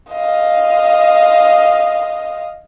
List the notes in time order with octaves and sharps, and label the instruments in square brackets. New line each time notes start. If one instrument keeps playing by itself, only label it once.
[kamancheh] D#5 F5